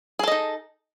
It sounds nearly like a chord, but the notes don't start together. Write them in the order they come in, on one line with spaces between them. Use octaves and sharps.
G#4 A4 D#5 D#4